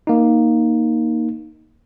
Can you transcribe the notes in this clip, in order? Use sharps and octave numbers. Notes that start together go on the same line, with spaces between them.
A#3 D#4